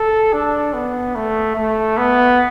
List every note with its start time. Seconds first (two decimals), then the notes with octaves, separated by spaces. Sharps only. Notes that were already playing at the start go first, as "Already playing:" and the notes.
Already playing: A4
0.33 D4
0.74 B3
1.16 A3
1.56 A3
1.98 B3